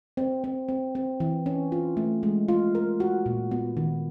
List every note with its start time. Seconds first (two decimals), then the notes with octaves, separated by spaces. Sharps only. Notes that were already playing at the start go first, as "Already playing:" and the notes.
0.17 C4
0.44 C4
0.68 C4
0.95 C4
1.20 E3
1.46 C#4
1.72 F4
1.97 A3
2.23 G#3
2.48 F4
2.75 A#4
3.00 F#4
3.26 A#2
3.51 B3
3.77 D#3